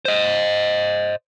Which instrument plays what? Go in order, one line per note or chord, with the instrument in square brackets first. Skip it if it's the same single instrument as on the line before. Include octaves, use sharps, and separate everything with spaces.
[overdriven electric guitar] C5 D#5